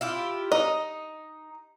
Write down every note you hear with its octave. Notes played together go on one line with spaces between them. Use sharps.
E4 F4 G4
D#4 D#5